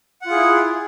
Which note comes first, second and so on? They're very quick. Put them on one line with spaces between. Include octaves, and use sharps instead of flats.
F#5 F4 G#4 E4